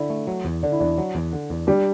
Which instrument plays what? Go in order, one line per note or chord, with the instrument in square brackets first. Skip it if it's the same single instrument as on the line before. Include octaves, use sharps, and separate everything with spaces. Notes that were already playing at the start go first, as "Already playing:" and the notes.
Already playing: [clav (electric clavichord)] D3 [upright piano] D4 E4
[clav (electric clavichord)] A3
F#3
E2
[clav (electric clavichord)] D3 [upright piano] D4
[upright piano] E4
[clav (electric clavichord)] E2 [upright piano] D4
[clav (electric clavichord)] F#3
E2
D3
E2
[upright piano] G3 [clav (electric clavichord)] D4